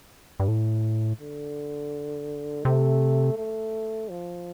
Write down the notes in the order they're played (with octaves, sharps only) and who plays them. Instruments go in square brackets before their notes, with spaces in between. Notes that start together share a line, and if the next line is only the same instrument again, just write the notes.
[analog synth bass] G2
A2
[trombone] D3
[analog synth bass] C3 [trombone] A3
[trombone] A3
F3